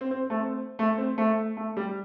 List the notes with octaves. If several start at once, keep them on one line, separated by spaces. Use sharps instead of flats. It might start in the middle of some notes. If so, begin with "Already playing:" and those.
C4
C4
A3
C4
A3
C4
A3
A3
G3